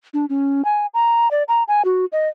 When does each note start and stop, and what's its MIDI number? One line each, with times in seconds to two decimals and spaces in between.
0.14 0.26 62
0.29 0.65 61
0.65 0.86 80
0.94 1.31 82
1.31 1.43 74
1.48 1.63 82
1.68 1.82 80
1.85 2.05 66
2.12 2.29 75